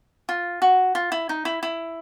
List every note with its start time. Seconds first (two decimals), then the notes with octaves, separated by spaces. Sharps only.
0.29 F4
0.62 F#4
0.95 F4
1.12 E4
1.29 D#4
1.45 E4
1.63 E4